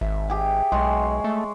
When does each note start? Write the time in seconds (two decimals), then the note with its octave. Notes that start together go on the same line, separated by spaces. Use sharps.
0.01 G#1 E5
0.28 G4 G#4 E5
0.72 B1 G#3 C#5 C6
1.24 A3